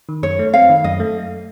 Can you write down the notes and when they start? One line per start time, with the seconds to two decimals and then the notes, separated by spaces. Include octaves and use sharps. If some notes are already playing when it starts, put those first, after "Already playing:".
0.09 D#3
0.23 F#2 C#5
0.39 A3
0.54 C4 F5
0.69 D#3
0.84 F#2 D#5
1.00 A3